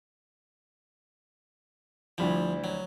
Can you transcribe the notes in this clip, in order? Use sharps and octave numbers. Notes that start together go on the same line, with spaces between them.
D2 F3 G3 E4
F#3